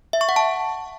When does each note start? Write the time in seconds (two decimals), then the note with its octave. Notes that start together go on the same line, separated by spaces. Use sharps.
0.13 E5
0.21 C#6
0.29 F#5
0.36 A5